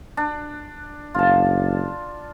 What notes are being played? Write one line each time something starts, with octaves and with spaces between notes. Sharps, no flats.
D4
F#1 F4 A5